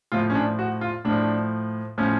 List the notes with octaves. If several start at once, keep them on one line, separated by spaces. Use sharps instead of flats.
A2 F3 F4
C#4
D4
F#4
F4
A2 F3 D4
A2 F3 C#4